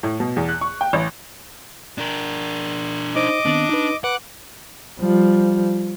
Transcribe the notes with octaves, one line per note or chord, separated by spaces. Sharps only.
A2
B2
E2
F#6
C#6
G5
A1
D4 A#4
D#4 C5 D#5 D6
D#3 B3 C4 D4
D#4 B4
B4 F#5 D6 F#6
F3 G3